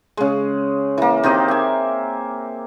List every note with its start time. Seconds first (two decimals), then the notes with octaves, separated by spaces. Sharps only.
0.17 C#3 G#3
0.98 E3 A#3
1.23 D#3 C4 G4 D#5
1.48 E5 G#5